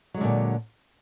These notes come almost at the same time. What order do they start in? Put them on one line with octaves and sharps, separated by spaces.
F#3 G#3 D3 A#2